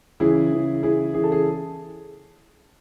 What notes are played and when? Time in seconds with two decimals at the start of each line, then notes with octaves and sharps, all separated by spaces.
0.20 C#3 E3 E4 G#4
0.52 C#3 E3
0.83 C#3 E3 E4 G#4
1.14 C#3 E3 G#4
1.23 A4
1.32 G#4